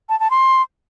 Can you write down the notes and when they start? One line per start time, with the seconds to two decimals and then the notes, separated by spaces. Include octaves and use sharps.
0.09 A5
0.20 A5
0.31 C6